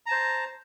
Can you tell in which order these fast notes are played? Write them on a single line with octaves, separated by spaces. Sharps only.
A#5 A5 C5